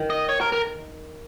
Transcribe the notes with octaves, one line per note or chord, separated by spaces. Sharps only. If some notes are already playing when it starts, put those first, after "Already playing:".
Already playing: D#3
D#5
C#5
A#4
A#4